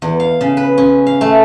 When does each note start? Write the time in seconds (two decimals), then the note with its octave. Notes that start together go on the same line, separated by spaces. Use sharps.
0.02 E2
0.20 F5
0.41 C#3
0.57 B4
0.78 C#4
1.07 F5
1.21 A3